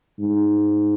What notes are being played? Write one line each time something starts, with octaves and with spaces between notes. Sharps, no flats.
G#2